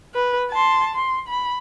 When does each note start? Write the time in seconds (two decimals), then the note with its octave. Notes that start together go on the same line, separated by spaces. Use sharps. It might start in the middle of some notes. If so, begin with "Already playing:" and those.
0.15 B4
0.51 A5 C6
0.95 C6
1.28 B5